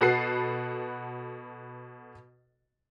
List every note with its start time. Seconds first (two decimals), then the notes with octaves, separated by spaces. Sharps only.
0.01 B2 F#4 A4 B4 C7